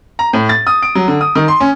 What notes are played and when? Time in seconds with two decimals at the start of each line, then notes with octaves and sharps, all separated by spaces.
0.19 A#5
0.33 A2
0.49 A6
0.67 D#6
0.82 D7
0.95 F#3
1.08 D3
1.21 D#6
1.35 D#3
1.48 C6
1.60 C#4